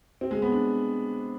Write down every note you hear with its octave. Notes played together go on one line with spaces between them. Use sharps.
C4
G#3
B3
D4